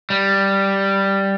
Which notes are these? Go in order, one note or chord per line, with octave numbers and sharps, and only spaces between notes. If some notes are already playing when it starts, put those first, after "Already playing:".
G3